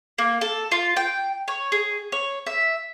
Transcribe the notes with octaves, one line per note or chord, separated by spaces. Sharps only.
A#3
A4
F4
G5
C#5
G#4
C#5
E5